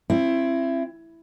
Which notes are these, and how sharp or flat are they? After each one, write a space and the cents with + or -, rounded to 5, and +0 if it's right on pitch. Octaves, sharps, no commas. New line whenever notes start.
C4 +30 E4 +25